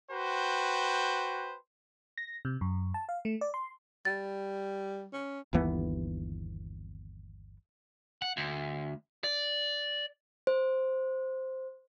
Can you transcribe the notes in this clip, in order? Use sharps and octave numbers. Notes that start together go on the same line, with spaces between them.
F#4 B4 C5 G5
A#6
C3
F#2
A5
F5
A3
D5
C6
G3 A6
C#4
G1 D#2 E3 B3
F#5
D2
D5
C5